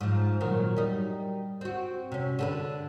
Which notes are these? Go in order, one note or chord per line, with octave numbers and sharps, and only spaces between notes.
G#2 F3
A#2 D#3 F#3
G3 D#4
C4 F#4
C3 C#4
D3 A4 B4